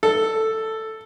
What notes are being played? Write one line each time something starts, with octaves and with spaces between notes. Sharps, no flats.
A4